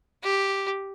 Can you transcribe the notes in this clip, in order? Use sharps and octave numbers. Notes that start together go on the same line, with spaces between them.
G4